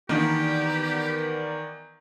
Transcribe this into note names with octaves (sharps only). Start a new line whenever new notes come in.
D#3 E3 A#3 B3 D4 G4 A#4 D5